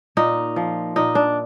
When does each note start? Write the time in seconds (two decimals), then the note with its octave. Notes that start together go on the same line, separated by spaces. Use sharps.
0.17 A#2 D#4
0.56 F3
0.96 A#2 D#4
1.15 D4